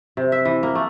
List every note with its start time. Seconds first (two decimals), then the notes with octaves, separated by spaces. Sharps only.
0.17 C3
0.32 E5
0.45 E3
0.63 A#3
0.75 A3